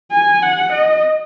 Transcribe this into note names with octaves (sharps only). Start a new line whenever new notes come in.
G#5
F#5
D#5